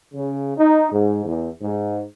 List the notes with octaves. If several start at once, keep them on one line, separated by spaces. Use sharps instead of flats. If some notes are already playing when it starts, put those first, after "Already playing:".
C#3
D#4
G#2
E2
G#2